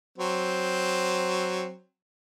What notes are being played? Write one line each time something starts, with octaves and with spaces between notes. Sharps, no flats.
F#3 C4